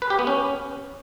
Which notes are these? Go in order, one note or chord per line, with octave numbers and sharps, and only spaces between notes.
B4
G4
B3
C#4